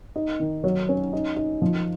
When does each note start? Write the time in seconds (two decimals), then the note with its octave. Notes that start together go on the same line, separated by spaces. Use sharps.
0.16 D#4
0.40 D#3
0.64 F#3
0.89 C#4
1.13 D#4
1.36 D#4
1.62 F3